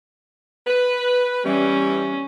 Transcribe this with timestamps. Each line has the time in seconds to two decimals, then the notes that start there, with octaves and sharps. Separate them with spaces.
0.67 B4
1.45 E3 G3 C#4